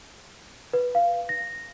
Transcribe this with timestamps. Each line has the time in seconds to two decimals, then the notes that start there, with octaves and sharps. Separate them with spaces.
0.73 B4
0.95 F5
1.29 A#6